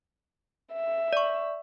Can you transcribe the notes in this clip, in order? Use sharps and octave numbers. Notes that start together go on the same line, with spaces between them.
E5
D5 C#6